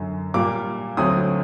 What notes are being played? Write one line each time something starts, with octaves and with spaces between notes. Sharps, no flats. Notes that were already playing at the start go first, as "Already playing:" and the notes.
Already playing: F#2 D3 F#3
A#2 G3 A#3 D6
D2 D3 F#3 C4 D#6